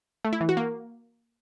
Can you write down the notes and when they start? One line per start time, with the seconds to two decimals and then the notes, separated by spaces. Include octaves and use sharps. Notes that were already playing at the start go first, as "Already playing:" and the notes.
0.25 A3
0.33 E4
0.41 E3
0.49 F#4
0.57 A#3